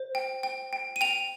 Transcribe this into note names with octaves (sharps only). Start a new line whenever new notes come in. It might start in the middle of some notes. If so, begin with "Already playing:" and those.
Already playing: C5
G5
G5
G5
D#7
G5 F7